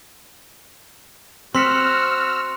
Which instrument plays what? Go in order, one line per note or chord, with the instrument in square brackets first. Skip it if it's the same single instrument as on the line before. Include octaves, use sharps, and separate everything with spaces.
[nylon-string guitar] C4 [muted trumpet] F#4 [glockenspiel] C6 B6 C#7 [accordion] E6 F6